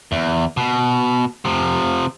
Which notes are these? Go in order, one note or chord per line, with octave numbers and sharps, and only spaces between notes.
E2
B2
C3 F3